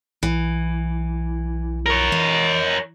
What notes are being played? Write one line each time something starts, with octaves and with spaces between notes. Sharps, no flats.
B1 E3
A#4 C#5
E3 D#5